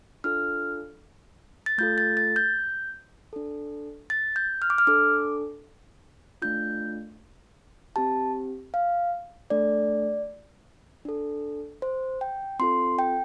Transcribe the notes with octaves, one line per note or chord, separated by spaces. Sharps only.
D4 F4 A4 F6
A6
A3 F4 A4 G6
A6
A6
G6
D4 A4
A6
G6
F6
D6
F6
D4 A4 D6
A3 D4 F4 G6
C4 G4 A5
F5
A3 D4 A4 D5
D4 A4
C5
G5
C4 F4 A4 C6
G5